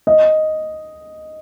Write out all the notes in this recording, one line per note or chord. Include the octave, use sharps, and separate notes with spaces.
D#5